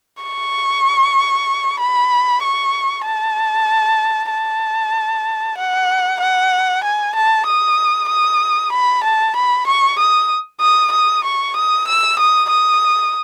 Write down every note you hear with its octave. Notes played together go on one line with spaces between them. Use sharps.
C#6
B5
C#6
A5
A5
F#5
F#5
G#5
A5
D#6
D#6
B5
A5
B5
C#6
D#6
D#6
D#6
C#6
D#6
E6
D#6
D#6